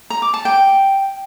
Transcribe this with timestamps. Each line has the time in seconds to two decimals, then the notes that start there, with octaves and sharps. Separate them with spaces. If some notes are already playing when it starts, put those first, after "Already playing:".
0.10 A#5
0.22 D6
0.34 A5
0.45 G5